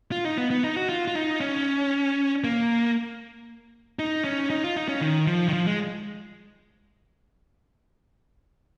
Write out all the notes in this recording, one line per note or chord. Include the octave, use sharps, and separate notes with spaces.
F4
D#4
B3
B3
D#4
F#4
F4
F4
D#4
C#4
A#3
D#4
C#4
D#4
F4
D#4
C#4
D#3
F3
D#3
F3
G#3